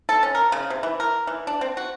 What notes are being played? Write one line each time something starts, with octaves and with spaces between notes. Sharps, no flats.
A4
C#4
A#4
C#3
C3
E3
A#4
E3
D4
C4
F#4